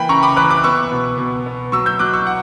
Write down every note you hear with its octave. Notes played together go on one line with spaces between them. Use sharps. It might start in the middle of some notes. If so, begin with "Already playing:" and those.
Already playing: E3 A#3 G5 B5
C#3 A#5 C#6
B5 D6
E3 D6 F#6
D6 F#6
B3 C#6 E6
B2
B2
B3
F#3 C#6 E6
E6 G6
F#3 D6 F#6
C#6 E6
F#5